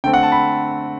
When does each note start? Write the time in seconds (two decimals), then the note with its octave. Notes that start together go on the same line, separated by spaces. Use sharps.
0.04 D3 A3 C4 G5
0.14 F#5
0.23 A5
0.32 B5